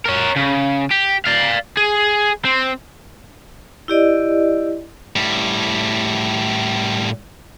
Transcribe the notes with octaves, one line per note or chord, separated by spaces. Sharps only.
A#4 C#5
C#3
G4
D5 F5
G#4
C4
E4 G4 D5 D#5
A2 G3